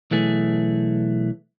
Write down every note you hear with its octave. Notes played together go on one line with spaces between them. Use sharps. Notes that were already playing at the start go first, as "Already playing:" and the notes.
B1 E3 A3 G#4